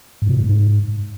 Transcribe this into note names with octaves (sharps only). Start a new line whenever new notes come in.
G#2
C3
A2
G#2